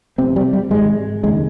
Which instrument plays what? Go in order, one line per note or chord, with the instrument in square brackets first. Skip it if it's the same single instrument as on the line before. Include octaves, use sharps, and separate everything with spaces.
[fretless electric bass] F1 F2 C3 C4
G3
G3
G#1 G#2 G#3
F1 D#2 C#3 G#3